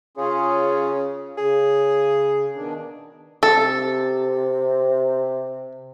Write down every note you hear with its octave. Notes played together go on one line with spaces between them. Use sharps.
C#3 C#4 F4 G#4
C#3 G#4
B2 D#3 D4
C3 A4